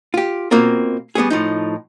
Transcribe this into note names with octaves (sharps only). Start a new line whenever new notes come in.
F4 G4
B2 A#3 C4 F4 A#4
G3 B3 C#4 G#4
A2 F3 D#4